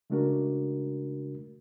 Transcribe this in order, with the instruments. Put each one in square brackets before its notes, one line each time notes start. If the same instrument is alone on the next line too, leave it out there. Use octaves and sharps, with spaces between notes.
[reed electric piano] C#3 G#3 A3 D4 F#4 A#4